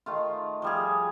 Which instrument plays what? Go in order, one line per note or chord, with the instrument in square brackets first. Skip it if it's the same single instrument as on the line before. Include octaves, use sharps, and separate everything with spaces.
[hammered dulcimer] D#3 A3 F4
F3 G3 G#4